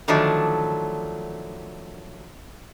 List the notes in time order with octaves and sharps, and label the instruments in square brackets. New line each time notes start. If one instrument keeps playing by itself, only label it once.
[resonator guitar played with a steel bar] D3 D#3 F3 F#3 A3 D5